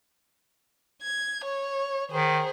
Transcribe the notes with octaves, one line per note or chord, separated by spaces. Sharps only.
G#6
C#5
D#3 G#4 C5